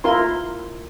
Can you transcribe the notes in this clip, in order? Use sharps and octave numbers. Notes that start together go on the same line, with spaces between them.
E4 F4 A#4 C6